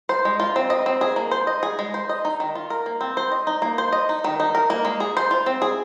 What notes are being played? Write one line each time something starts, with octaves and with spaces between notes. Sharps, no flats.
C5
G#3
F4
C4
D#5
C4
G#4
A#3
C5
D#5
G#4
G#3
C5
D#5
D#4
D#3
F4
A#4
A#3
C4
C5
D#5
D#4
A#3
C5
D#5
D#4
D#3
D#4
A#4
A#3
G#3
G#4
C5
F4
C4
G#4